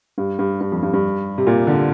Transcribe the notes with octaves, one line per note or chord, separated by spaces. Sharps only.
G2
G2
G2
F2
G2
G2
C3
A#2
D3